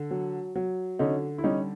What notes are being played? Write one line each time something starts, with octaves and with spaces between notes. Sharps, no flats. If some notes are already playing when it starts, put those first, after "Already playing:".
Already playing: D3
F#3
F#3
D3 C#4 D#4
E4
G3 C#4 D#4